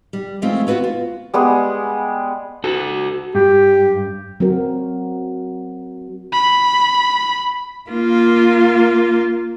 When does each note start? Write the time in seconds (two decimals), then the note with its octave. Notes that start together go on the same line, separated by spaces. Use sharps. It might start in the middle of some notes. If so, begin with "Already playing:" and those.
0.13 G3
0.42 E3 G#3 A3 C4 F4
0.67 B3 F4 F#4 B4 C#5
0.84 F4
1.34 G3 G#3 B3 G#4
2.64 F#4 A4
3.35 G2 G4
4.40 F#3 C4 F#4 A#4
6.33 B5
7.90 A#3 F4